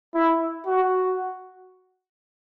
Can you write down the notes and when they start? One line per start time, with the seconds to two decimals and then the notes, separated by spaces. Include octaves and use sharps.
0.14 E4
0.66 F#4